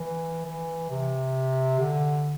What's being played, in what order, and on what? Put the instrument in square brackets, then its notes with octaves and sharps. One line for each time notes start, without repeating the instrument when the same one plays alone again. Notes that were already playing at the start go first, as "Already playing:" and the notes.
Already playing: [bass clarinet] E3
E3
C3
D3